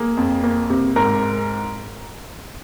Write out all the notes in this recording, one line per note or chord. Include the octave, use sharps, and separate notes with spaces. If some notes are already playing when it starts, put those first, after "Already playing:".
Already playing: A#3 G#4
F2
A#3
C3
G#2 A#4 A#5